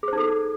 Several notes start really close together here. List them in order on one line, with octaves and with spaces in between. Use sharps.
G#4 C5 D#4 A4